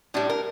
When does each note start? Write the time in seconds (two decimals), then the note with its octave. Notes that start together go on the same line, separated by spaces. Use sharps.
0.14 A2 G3 D4
0.30 A#4